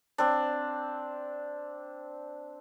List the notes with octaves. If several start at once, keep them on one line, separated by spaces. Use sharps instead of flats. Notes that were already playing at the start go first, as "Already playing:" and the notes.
C4 D4